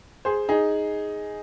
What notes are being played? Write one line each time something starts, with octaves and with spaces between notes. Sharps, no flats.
G#4 C5
D#4 G#4